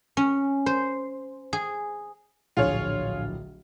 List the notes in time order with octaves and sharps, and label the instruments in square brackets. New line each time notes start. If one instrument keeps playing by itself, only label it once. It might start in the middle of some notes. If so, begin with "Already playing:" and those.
[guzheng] C#4
C5
G#4
[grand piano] D1 A#1 [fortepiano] F4 G#4 C#5